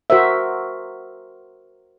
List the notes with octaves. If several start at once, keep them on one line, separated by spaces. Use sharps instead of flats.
F#4 A#4 C5 E5